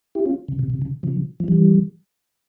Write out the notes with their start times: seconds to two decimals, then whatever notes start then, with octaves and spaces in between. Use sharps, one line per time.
0.15 E4 G4
0.25 C#4 F4
0.48 C#3
0.59 C3
0.70 C3
0.82 C#3
1.03 C#3 F3
1.40 F3
1.48 E3 G3